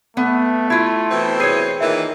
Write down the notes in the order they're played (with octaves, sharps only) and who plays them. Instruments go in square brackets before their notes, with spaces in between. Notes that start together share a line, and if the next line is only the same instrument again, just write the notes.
[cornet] A3 [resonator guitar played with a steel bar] B3
[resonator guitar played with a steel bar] E4 F4 [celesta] G#6
[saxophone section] B2 E3 C4
[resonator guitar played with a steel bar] G#4 C#5 [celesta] G6 C7 D#7
[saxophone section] A#2 D#3 E3 [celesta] E5